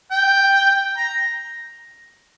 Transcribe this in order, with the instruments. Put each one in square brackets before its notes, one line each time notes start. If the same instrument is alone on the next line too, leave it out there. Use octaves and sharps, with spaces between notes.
[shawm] G5
A#5